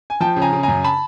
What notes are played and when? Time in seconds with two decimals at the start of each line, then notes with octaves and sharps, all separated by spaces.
0.10 G#5
0.20 F3 G5 A5
0.36 C#3
0.42 G#5 A#5
0.53 C#3
0.63 F#2 G#5 A#5
0.84 A5 B5